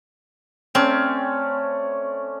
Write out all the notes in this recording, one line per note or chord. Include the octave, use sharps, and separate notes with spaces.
A3 C4 C#4 D5